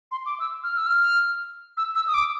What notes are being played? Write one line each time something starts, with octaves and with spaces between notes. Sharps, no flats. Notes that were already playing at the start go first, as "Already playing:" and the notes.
C6
D6
E6
F6
E6
F6
E6
E6
D#6
D6